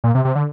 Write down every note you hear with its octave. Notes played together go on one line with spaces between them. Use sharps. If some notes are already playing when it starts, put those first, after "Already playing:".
A#2
C3
C3
D3